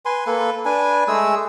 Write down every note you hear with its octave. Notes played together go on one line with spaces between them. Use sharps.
B4 G#5 C6
A#3 A4 B4
D4 B4 G#5
G#3 A3 G#4 E6